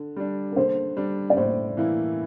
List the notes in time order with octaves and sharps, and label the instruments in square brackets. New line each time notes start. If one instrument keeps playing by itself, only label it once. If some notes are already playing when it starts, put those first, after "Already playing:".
Already playing: [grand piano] D3
G3 D4
[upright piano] A#4
[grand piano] D3 [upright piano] C5
[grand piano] G3 D4
[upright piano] D5
[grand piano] A2 [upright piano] C5
[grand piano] E3 A#3 E4